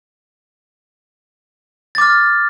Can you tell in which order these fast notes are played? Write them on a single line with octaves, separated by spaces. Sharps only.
A6 D6 F6